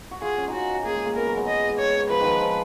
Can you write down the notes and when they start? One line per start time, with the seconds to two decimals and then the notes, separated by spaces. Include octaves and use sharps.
0.11 F#4
0.22 F4 G#4
0.38 C#4
0.48 D#4
0.53 C#4 F#4
0.85 A#3 G#4
0.95 G#3
1.05 A#3
1.15 B3 A#4
1.26 F#3
1.37 G#3
1.47 D#5
1.79 C#5
2.10 F3 B4
2.21 D#3 F3
2.41 F3